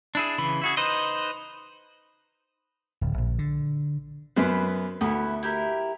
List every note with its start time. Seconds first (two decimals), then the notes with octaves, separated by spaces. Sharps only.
0.15 D4 E4 G#4
0.38 C#3 E3 B5
0.62 E4 F#4 G#4
0.77 D#4 B4 C5 D#5
3.01 D1
3.18 A#1
3.38 D3
4.36 F#2 B3 B4 C5 C6
5.01 D2 B3 E4
5.43 E4 G4 A#4